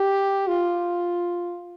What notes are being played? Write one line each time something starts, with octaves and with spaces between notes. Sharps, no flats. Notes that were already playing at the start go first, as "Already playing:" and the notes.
Already playing: G4
F4